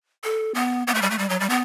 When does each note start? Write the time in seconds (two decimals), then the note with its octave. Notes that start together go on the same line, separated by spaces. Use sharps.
0.24 A4
0.54 B3
0.87 B3
0.94 A3
1.02 G3
1.10 A3
1.18 G3
1.29 F#3
1.40 G3
1.49 B3